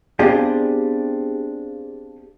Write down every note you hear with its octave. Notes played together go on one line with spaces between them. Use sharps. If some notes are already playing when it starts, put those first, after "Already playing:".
B3 C4 D4 F4 G4 G#4